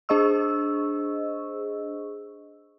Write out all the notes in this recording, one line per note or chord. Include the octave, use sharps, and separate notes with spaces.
D4 G#4 C5 D#5 C#6 E6